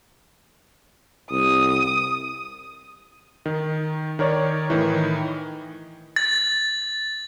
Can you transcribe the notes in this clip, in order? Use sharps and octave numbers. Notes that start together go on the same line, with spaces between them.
C2 D#6
D#3
D#3 A#4 C#5 D5
A2 D#3 E3
A6